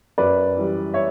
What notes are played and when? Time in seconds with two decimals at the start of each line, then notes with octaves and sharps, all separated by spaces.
0.18 F#2 B4 D5
0.56 E3 G3
0.94 C#5 E5